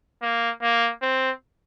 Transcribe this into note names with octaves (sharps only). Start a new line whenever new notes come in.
A#3
A#3
C4